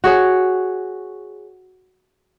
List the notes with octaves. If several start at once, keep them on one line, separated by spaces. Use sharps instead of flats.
F#4 G#4 C#5